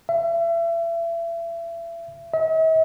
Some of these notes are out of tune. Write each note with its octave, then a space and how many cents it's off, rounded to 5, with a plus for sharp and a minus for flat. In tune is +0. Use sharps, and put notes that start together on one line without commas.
E5 +35
E5 -45